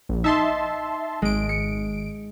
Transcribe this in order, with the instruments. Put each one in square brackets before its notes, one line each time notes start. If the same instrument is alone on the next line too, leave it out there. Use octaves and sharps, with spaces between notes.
[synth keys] A#1
[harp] D#4 [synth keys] E5 A5 C6
[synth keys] G#1 D7 [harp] G#3
[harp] C#7